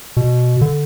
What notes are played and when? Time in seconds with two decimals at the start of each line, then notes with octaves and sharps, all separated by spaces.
0.17 B2
0.61 D3